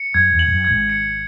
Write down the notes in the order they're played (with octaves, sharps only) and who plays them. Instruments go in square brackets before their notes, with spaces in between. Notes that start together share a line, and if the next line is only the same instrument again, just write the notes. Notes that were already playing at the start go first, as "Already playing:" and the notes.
Already playing: [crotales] C#7
[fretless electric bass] F#2 [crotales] G#6
[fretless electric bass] E2
[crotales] F#7
[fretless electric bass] G#2
F#2
[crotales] G#6
[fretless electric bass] G#1 G#2
[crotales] C#7